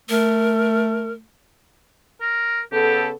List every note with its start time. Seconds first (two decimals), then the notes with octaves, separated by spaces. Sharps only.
0.10 A3 A#4
2.21 A#4
2.72 C#3 B3 G4 A4